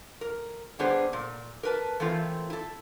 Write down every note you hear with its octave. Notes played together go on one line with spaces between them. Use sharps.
A#4
D3 G3 B3 D4 G#4 C5
A#2
A#4 B4 A5
E3 A3 A#3 C4 F4
E4 A4